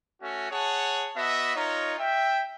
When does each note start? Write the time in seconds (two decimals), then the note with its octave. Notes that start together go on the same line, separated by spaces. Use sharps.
0.22 A3 C#4 F#4
0.51 G#4 C#5 F#5 A5
1.17 B3 F#4 D#5 E5
1.56 D#4 F4 A#4 C#5
1.99 E5 G5